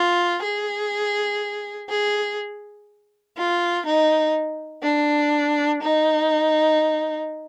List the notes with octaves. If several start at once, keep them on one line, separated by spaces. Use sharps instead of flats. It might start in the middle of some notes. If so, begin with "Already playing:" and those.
Already playing: F4
G#4
G#4
F4
D#4
D4
D#4